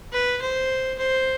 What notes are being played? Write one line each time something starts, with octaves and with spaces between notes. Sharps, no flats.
B4
C5
C5